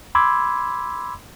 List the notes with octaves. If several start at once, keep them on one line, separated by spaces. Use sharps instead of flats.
B5 C6 D6 E6 G#6